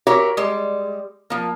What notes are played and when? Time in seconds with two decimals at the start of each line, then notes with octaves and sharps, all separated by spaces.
0.07 F#4 G4 A#4 C#5 E5
0.37 G3 G#3
1.30 F3 A#3